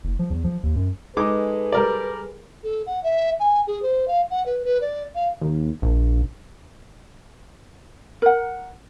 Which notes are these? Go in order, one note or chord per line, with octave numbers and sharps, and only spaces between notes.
F#1
F3
E2
F3
D#2
F#2
G#3 D#4 G#4 A4 B4 D6
G3 A#4 D5
A4
F#5
E5
G#5
G#4
C5
F5
F#5
B4
B4
D5
F5
D#2
A#1
A#4 F#5